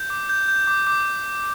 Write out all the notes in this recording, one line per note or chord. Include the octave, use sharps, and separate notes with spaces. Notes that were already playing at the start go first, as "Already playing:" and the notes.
Already playing: G6
D6
G6
G6
D6
D6